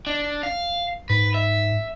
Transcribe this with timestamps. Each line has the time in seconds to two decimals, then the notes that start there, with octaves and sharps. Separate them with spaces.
0.07 D4
0.43 F5
1.10 G#2 B4
1.34 E5